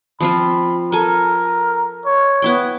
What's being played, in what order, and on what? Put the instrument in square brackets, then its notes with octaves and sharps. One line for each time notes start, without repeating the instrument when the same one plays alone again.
[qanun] F3 C4 F4 [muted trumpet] B5
[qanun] A4 G#5 [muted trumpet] A#4
[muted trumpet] C#5
[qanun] B3 E4 G5